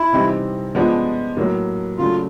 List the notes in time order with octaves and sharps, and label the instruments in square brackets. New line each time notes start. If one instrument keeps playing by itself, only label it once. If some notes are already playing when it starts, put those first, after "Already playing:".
Already playing: [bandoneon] E4
[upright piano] C3 E3 G3 C4 D#4
F3 G#3 B3 D4
A2 F#3 A#3
[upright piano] C#3 F#3 A3 D4 [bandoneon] F4